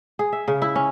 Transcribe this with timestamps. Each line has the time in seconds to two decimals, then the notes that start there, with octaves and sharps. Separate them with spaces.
0.19 G#4
0.33 E5
0.48 C#3
0.62 E4
0.76 C#4